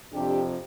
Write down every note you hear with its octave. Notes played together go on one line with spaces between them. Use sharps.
F2 C3 F3 D4 G4